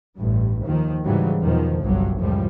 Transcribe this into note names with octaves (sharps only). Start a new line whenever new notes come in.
A1 G2
D#2 D#3 F3
G#2 C#3 E3 F#3 G3
E2 B2 D#3 F3
G1 C2 G2 F#3
C#2 F#2 A2 F3 G3